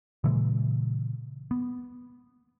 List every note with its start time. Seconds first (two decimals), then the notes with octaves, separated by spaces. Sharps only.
0.24 A#2 C#3 E3 G#3
1.51 B3